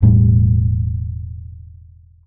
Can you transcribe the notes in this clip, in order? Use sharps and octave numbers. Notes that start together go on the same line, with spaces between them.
E1 A2 G3